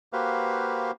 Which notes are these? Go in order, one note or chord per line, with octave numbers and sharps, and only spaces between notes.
A#3 F#4 G4 B4 C5 F5